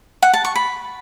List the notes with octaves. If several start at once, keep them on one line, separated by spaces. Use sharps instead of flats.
F#5
A5
C#6
B5